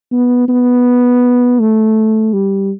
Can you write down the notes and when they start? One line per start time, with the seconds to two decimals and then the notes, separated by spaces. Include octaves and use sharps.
0.12 B3
0.48 B3
1.60 A3
2.33 G3